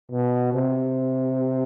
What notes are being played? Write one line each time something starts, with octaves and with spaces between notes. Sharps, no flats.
B2
C3